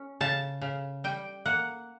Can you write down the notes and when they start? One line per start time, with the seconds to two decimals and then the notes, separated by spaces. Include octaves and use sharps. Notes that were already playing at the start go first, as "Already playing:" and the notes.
Already playing: C#4
0.21 C#3 A5
0.61 C#3
1.04 G3 G5
1.46 A#3 F#5